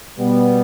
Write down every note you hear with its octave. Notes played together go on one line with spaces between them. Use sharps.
B2 G3 B3